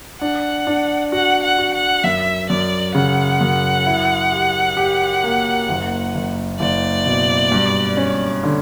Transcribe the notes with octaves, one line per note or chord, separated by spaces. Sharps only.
D4 F#5
D4
F#4 F#5
F#5
F#4
F#5
F#2 E5
F#2 D5
C#3 F#5
F#2
E4
G4
G4
A#3
F#1
F#1
F#1 D5
B2
G2
C#4
D3